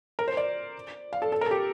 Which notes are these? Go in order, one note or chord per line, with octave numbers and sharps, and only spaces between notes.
A#4
C5
D5
F5
A4
A4
A#4
A4
G4